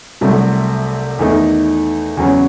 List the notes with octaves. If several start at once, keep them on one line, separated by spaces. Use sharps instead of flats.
C2 C3 F#3 A3
E2 D#3 A3 D#4
E2 C#3 F#3 C#4